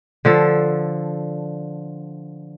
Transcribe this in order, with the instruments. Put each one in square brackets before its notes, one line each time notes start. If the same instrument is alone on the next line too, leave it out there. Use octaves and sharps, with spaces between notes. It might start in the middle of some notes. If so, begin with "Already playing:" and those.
[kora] D3 F3 A4